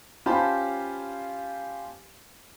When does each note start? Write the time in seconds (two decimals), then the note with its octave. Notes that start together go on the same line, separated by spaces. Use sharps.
0.26 C#4 F4 G4 C5 A5 B5